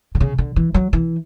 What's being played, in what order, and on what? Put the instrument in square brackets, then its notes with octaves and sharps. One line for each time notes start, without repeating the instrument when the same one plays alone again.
[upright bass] D3
C#3
D3
E3
F#3
E3